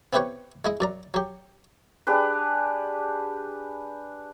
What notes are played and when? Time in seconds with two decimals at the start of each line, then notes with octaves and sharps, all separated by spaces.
0.13 B3 C4 E4 G4 B4 C#5
0.65 G#3 E4 D#5
0.80 F#2 D5 A#5
1.14 F#3 G4
2.07 D4 G4 G#4 B4